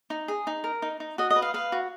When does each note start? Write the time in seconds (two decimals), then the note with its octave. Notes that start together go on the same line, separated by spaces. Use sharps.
0.10 D#4
0.28 G#4
0.47 D#4
0.64 A#4
0.82 D#4
1.00 D#4
1.18 F#4 D#5
1.30 D#5
1.36 B4
1.42 F5
1.54 B4 F5
1.72 F#4